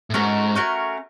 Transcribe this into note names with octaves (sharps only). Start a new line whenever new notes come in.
A2
G#2 A3 C#4 F#4 A#4
A3 C#4 F#4 A#4